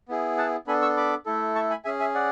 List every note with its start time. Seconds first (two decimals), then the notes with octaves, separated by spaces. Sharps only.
0.08 B3 E4 G#4
0.37 F#5 A5
0.67 B3 D4 A4 G#5 B5
0.82 C#6 E6
0.97 B5 D6
1.26 A3 E4 A4
1.55 A5 C#6
1.70 G#5 B5
1.85 C#4 G#4 E5 G#5
2.00 E5 G#5
2.14 D5 F#5